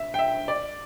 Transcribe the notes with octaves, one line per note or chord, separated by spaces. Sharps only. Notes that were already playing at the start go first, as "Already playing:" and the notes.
Already playing: E5
G5
E5
D5